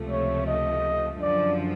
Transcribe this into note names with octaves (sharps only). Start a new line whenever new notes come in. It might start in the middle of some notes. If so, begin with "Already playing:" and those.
Already playing: C#2 C3 F3 A3
C#5
D#5
F#2 D3 F3 D5